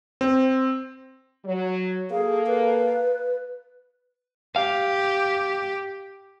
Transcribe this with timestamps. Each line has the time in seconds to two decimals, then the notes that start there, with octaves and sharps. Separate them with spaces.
0.21 C4
1.45 F#3
2.11 A#3 G#4 A4 F5
2.47 B4
4.56 G4 F5